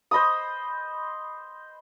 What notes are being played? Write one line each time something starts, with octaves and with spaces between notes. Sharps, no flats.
C5 D#5 B5 D#6